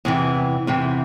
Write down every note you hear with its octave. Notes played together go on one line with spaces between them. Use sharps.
E2 C3 E3
E2 C3 E3